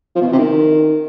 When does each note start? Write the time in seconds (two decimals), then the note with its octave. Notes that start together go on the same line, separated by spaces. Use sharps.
0.15 F3
0.21 B2
0.27 E3
0.33 C3
0.38 D#3